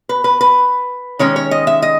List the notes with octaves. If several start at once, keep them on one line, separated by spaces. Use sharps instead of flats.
B4
B4
B4
D#3 G#3 C#4 C#5
C#5
D#5
E5
D#5